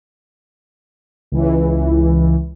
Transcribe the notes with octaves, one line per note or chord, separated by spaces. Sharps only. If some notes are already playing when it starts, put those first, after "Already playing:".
C#2 E3